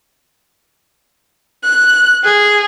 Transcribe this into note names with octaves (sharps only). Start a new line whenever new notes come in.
F#6
G#4